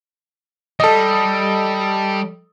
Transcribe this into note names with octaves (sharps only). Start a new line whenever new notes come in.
G3 A4 D#5